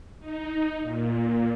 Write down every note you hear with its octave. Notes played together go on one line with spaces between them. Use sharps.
D#4
A#2